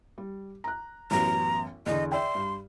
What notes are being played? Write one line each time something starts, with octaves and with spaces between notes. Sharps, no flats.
G3
A#5 F#6
A1 F#2 B3 A#5
E2 D3 D#5
D5 E5 G5 C6
G2